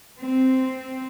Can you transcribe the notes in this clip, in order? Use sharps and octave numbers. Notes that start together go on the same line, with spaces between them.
C4